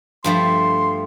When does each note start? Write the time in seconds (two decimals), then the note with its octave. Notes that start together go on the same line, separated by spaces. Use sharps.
0.24 G2 F3 A3 C6